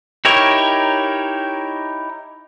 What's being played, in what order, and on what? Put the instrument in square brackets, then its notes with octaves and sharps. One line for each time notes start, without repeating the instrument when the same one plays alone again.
[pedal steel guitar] D#4 E4 G4 A#4 C#5